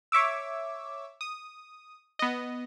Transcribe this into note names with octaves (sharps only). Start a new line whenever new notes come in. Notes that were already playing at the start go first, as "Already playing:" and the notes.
C#5 E5 D6 E6
D#6
B3 D#5